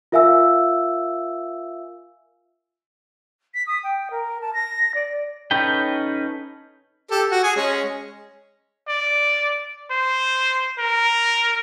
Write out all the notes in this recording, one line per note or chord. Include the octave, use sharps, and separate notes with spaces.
F4 A#4 E5 F5 G#5 E6
B6
D#6
G5
A#4
A5
A#6
D5
C#4 D#4 A4 B4 G5
G4 A4
F#4
G#4 G#5
G#3 C#4
D5
C5
A#4